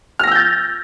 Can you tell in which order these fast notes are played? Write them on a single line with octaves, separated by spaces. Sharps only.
F6 A#6 E6 G6 A6